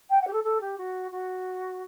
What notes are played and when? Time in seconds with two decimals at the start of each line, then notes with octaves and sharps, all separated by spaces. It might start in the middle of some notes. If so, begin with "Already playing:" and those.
0.09 G5
0.21 F#5
0.27 G4
0.32 A4
0.43 A4
0.60 G4
0.77 F#4
1.11 F#4